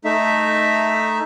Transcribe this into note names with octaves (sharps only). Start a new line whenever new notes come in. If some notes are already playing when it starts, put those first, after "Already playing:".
A3 D#4 E5